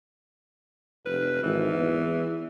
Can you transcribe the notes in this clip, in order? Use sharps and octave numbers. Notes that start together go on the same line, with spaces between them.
F1 B4
G#1 E3
E2